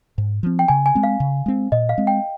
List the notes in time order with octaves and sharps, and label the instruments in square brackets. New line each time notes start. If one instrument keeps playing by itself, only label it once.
[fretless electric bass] G#2
F3 C4
[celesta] G5
[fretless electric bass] C#3 [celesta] G#5
[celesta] G#5
[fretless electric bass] G#3 C4
[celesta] F5
[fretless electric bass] C#3
G#3 C4
[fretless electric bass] A#2 [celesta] D#5
[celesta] F5
[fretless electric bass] G#3 C4
[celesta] G5